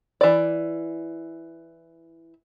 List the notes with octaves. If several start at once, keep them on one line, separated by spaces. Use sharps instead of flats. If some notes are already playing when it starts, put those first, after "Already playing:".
E3 D5